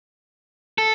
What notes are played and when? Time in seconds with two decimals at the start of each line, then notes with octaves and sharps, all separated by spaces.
0.78 A4